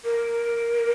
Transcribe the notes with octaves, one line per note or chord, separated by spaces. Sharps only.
A#4